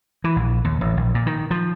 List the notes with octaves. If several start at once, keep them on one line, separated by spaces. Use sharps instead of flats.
E3
A#1
D#2
A1
A#1
A#2
D#3
F3